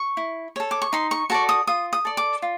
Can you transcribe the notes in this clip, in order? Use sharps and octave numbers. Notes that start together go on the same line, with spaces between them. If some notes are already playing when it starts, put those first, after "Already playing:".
Already playing: C#6
E4
A4 C#5
D6
C#6
D#4 C6
C#6
F#4 A4 D5 C#6
D#6
F4 D#6
D#6
A4 D5
D6
F4